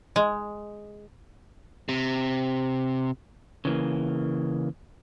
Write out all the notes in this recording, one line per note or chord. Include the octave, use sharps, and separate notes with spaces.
G#3
C3
C#3 E3 A#3